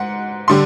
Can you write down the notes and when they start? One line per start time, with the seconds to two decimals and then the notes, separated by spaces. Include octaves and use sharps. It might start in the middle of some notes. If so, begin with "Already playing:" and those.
Already playing: G#2 F#5
0.48 D3 G3 C6